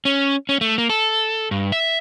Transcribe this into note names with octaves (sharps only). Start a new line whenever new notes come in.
C#4
C#4
A3
A#3
A4
G2
E5